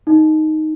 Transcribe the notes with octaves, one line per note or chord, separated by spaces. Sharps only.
D#4